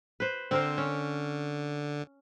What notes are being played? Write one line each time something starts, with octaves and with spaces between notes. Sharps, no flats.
B4 C5
D3 C4 A#4 C5
C#4